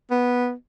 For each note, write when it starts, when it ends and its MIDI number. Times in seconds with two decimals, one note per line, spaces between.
0.11 0.53 59